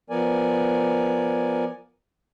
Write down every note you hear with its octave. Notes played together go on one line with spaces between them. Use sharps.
F3 B3 A#4 D5 G#5